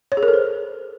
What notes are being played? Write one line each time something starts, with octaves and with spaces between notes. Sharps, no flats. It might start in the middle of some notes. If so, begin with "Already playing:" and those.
C#5
G#4
A#4
A4
C5